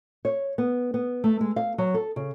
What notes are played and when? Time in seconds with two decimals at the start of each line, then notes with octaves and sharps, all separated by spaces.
0.25 C#5
0.58 B3
0.94 B3
1.24 A3
1.41 G#3
1.56 F5
1.78 F#3
1.94 A4
2.16 C#3